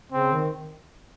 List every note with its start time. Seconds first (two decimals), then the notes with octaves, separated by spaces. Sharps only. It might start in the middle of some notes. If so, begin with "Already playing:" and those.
0.12 C#3 C4
0.33 D#3